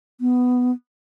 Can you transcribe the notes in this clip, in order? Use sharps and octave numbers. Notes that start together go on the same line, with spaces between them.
B3